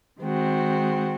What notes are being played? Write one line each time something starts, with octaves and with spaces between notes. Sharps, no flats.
D#3 G#3 C4 F#4